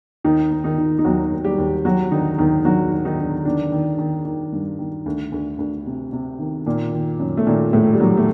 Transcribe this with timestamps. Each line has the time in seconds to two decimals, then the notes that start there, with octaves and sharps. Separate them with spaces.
0.24 D#2 D#3 D#4
0.51 D#3
0.64 D#3 D#4
0.78 D#3
0.99 D#4
1.04 D#2 F#3 F#4
1.32 D#2
1.44 G3 G4
1.58 D#2
1.85 D#2 F#3 F#4
2.11 D3 D#3 D#4
2.38 D#2 D#3 D#4
2.65 D3 F#3 F#4
2.91 D#2
3.05 D#3 D#4
3.19 D3
3.45 D3 D#3 D4
3.72 D#3
3.98 D#3
4.25 D#3
4.52 G2
4.79 D#3
5.06 D2
5.32 D2
5.59 D2
5.86 C3
6.13 C3
6.39 D#3
6.66 A#2 D#3 A#3
6.93 D#3
7.20 F#2
7.37 A3
7.46 A#2 D#3 A#3
7.73 A2 D#3 A3
7.93 G3
8.00 D#3 F#3
8.17 A3